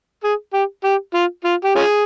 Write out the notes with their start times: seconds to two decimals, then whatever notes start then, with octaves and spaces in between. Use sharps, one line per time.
0.24 G#4
0.54 G4
0.84 G4
1.14 F4
1.45 F4
1.65 G4
1.76 C#4 F4 G#4